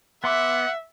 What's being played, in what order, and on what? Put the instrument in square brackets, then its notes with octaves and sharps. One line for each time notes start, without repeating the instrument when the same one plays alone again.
[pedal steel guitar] B3 C6 D6 [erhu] E5 [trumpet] F#5